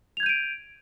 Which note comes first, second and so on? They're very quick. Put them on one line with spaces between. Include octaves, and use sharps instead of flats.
F7 G#6 G6 D#7 D7